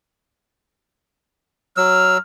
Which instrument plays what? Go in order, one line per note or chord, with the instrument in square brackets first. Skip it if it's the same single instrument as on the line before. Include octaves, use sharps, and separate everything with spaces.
[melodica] F#3 E6 [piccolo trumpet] F6